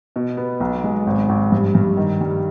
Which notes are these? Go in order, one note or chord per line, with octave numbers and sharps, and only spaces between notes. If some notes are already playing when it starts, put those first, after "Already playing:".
B2
B3
B1
G#3
G#1
G#1
G2
G2
D#3
G3